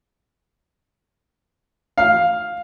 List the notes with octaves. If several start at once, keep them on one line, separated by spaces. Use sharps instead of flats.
F5